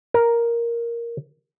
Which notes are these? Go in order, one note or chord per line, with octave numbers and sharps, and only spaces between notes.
A#4